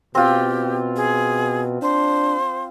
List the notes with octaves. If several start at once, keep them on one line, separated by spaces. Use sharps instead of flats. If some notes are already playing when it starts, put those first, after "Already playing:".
B2 C4 F4 G4
G#4
D4 C5